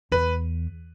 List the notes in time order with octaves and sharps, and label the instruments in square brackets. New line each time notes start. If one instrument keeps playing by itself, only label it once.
[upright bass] E2 [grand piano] B4